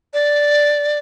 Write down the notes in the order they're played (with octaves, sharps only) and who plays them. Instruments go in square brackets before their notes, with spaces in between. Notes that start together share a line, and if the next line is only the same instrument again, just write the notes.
[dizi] D5